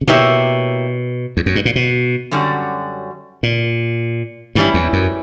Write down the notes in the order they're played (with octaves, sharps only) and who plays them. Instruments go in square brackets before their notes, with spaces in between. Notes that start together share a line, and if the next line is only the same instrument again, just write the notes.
[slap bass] C#3
[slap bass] B2 [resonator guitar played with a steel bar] A#3 E4 G4 C#5 E5
[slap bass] E2
F#2
G2
A#2
B2
[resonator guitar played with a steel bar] F#2 D3 G3 C#4 F#4
[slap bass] A#2
[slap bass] G2 [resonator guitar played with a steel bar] E3 G3 C#4 E4
[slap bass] E2
F#2